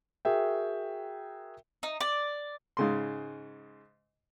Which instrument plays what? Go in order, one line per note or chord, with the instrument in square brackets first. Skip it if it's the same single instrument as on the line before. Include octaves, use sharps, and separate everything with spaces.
[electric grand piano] F#4 G#4 A#4 E5 G5
[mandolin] D#4
D5
[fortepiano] G#2 C#3 C6